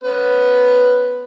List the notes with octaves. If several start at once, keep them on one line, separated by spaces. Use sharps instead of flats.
B3 C#4 B4